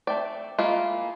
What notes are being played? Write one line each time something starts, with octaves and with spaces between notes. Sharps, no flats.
A3 C4 D5
G#3 A#3 E4 F4